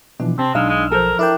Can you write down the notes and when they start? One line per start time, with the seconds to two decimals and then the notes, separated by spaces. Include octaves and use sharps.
0.20 B2 E3 F3 D4
0.39 C3 C4 A5
0.55 B1 G#3 D4 D#4 F5 E6 F6
0.69 G#3
0.92 F3 A4 A#4 C5
1.19 D4 E4 A#4 G5